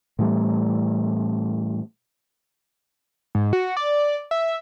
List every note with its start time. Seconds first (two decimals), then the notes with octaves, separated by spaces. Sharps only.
0.19 A2 E3 G3 A3
3.35 G#2
3.53 F#4
3.77 D5
4.31 E5